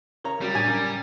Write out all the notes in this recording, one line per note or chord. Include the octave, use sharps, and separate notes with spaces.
C#3 A#4 C#5 A#5
C#3 F#3 G3 G4
A2 D4 G#5
C#4 A#4